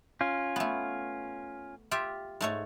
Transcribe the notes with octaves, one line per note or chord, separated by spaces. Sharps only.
C#4 F4
A3 B3
F4 G4 E5
G#2 A3 C#5